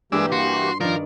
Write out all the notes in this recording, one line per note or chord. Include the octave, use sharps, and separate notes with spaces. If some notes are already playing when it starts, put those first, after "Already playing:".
G2 E3 G#3 A#3 G4 D5 E6
F#4 C6
G2 D#3 F3 A#4 D5